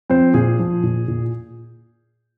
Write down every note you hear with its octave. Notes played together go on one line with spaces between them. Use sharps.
F3 C4 C5
A#2 G#4
F3
A#2
A#2